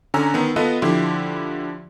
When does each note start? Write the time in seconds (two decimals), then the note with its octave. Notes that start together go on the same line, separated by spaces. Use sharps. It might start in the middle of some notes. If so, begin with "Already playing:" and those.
0.14 D3 C#4 G#5 A#5 E6
0.34 D#3 B3
0.56 B3 F4 A4 B4 D#5
0.82 D3 F3 E4 G4 C6